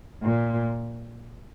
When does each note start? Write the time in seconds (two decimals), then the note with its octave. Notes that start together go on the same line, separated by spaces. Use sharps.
0.23 A#2